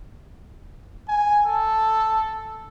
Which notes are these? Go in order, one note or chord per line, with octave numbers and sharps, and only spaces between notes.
G#5
A4